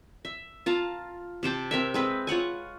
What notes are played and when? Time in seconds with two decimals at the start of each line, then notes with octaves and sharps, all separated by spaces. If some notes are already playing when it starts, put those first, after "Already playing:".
0.25 E5
0.66 F4 F5 A5 A#5
1.43 C3 C5 G5 A5
1.71 C4 A#4 E5
1.94 G#3 C4 B4
2.27 F4 C#5 F#5 G#5